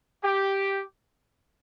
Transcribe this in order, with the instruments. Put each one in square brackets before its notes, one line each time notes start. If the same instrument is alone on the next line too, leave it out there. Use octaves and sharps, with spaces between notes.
[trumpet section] G4